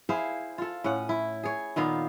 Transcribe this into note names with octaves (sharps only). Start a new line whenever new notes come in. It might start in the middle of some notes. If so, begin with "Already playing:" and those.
E4 G#4 C5 F5
F4 A4
A2 C#4 F#5
E4
G#4 C#5
A#2 D#3 B3 F5